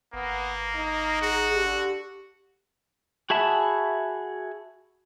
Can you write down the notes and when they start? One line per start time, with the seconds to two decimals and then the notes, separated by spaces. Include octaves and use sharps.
0.14 G#1 A#3 B3
0.76 D#4
1.21 F#4 G#4
1.54 D3 G4
3.30 F#4 G#4 E5 A5 B5